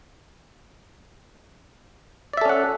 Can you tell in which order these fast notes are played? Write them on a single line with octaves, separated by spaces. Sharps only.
D5 E5 A4 C#4 F#5